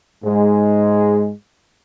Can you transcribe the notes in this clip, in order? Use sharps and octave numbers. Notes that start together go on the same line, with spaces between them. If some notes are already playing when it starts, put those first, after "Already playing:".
G#2 G#3